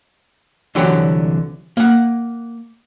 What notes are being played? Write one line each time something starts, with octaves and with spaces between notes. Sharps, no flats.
C2 D3 E3 F#3 G4 C#5
A#3 F#5